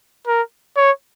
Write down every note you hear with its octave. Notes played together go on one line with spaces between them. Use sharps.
A#4
C#5